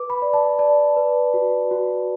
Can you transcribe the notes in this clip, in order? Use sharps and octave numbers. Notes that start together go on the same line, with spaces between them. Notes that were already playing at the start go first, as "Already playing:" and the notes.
Already playing: B4 D6
B5
D5
A5
D5 A5
B4
F#4
F#4